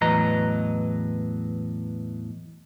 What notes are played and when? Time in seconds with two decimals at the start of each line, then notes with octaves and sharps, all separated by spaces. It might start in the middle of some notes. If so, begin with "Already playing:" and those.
0.01 E2 A2 F#3 B4 D#5 A#5